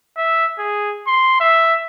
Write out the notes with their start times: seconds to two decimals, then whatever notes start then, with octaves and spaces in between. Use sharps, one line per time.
0.17 E5
0.59 G#4
1.07 C6
1.40 E5